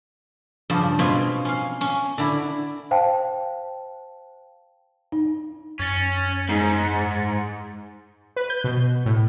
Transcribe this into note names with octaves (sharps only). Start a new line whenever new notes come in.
G2 C#3 F3
B2 C4 F4 C#5 G#5
C#4 F5
C#4
D3 E4
C5 F5 G5 A5
D#4
F#2 C#4 A6 C#7
G#2 G#3 D#4
B4
G6
B2
A2